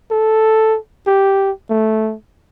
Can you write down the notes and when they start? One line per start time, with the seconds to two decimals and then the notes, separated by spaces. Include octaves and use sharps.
0.11 A4
1.07 G4
1.70 A3